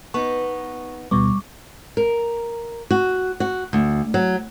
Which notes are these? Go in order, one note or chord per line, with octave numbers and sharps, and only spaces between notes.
B3 D#4 C#6
D2 B2 G3 B3 C#6 D6
A#4
F#4
F#4
D2
F#3